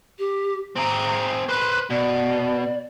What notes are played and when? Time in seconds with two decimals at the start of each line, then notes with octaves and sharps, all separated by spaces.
0.18 G4
0.76 C4 G#4 A#5
1.48 B4 C5 F#6
1.90 B2 D5